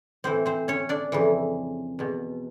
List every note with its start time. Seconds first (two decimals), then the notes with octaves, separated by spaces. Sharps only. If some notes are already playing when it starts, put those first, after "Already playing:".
0.24 A2 E3 C4 C5
0.46 C4 C5
0.68 C#4 C#5
0.89 D4 D5
1.12 F2 C#3 E3
1.99 E2 B2